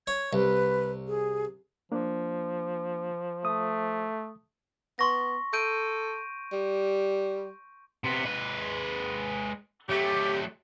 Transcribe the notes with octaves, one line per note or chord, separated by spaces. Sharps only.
C#5 G#6
C2 B4
G#4
F3 A#3 D4
A3 D#6
B3 C6 C#6 A#6
A4 G6 D7 D#7
G3
C3 B3
G#3 B4
F#3 A3 G4